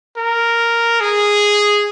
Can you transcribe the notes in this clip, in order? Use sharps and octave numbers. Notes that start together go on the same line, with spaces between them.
A#4
G#4